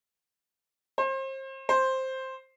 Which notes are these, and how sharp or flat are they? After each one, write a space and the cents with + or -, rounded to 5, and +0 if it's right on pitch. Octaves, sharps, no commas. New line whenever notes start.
C5 +35
C5 +5